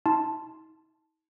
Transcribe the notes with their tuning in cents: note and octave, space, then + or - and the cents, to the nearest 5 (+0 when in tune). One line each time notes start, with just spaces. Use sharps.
D#4 +45 A5 +0 C6 +0